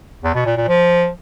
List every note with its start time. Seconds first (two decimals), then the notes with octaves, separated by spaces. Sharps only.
0.24 E2
0.35 B2
0.46 A#2
0.57 A#2
0.68 F3